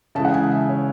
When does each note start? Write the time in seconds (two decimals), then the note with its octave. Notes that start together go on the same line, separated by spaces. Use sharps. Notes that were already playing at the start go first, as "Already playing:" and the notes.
0.15 C#3 E3 G#3 A5
0.25 F#5
0.34 G#5
0.51 E5
0.69 C#5